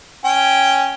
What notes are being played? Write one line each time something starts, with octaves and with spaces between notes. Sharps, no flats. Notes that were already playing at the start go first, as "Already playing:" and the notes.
C#4 G5